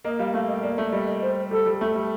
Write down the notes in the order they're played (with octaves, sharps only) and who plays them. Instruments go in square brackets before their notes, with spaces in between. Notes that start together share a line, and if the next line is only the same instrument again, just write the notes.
[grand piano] A#3 [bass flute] D#5
[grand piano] G3 [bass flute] F5
[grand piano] A3 [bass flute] F5
[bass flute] D#5
[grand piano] A#3 [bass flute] D5
[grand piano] A3
[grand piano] G3 [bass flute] D#5
[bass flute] D#5
C5
[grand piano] G3 [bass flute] A4
[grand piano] G3
A3
G3